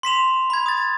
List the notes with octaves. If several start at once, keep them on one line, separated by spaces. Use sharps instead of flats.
C6 B6 E7 F7
B5 G#6
D#6 A6